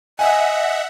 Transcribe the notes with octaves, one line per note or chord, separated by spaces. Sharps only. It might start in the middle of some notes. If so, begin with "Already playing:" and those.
D#5 E5 F#5 G#5